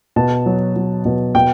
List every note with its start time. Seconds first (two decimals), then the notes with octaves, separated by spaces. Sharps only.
0.16 B2 A5
0.46 F#3
0.76 F#3
1.05 B2
1.35 B2 G5